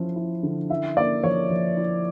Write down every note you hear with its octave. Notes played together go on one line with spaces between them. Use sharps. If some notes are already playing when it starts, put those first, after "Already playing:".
Already playing: F3 C#4 E4
E4
D3
E4 E5
A#3 D5
F3 C#5
F3
E4